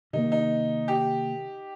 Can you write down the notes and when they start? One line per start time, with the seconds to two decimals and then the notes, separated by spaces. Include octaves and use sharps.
0.13 C3 D#3 A#3 D#4
0.32 D#4
0.88 G4